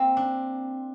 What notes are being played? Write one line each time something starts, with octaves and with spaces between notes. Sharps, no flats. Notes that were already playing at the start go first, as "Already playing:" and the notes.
Already playing: A#3 C4
D4